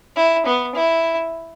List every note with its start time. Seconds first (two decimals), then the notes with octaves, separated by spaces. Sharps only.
0.16 E4
0.45 B3
0.75 E4